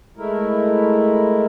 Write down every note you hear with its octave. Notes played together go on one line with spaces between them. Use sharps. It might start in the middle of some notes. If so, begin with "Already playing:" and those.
G#3 A3 E4 A#4